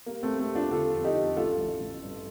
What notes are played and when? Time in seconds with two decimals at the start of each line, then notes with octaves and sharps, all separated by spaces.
0.06 G3 A#3
0.23 A3 C4
0.29 G3
0.39 A3
0.49 G3
0.55 D4 F4
0.71 D3 F4 A4
0.93 F2
1.04 D#4 G4
1.16 F2
1.36 A1 F4 A4
1.58 A1
1.80 A1
2.02 G2